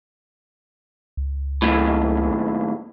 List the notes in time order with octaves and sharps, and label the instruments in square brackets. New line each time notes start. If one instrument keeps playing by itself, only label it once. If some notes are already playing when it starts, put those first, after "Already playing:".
[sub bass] C#2
[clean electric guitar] D#2 A2